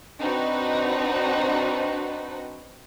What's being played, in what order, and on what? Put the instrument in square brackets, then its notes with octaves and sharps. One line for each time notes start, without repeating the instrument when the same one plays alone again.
[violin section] C4 D4 D#4 F#4 B4